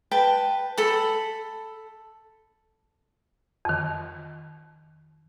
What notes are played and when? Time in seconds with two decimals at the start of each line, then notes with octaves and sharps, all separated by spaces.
0.11 B4 G5 A5
0.78 A4 B5
3.65 F2 D#3